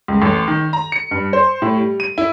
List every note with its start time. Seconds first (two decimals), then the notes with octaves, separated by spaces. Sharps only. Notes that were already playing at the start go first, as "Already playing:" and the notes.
0.08 C#2
0.22 A1
0.48 D#3
0.73 A#5
0.92 C#7
1.11 G2
1.33 C5
1.62 A2
1.76 G3
2.00 D#7
2.18 E4